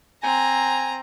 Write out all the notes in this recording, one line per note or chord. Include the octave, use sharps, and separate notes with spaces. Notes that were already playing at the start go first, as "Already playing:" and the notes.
C4 G#5 A#5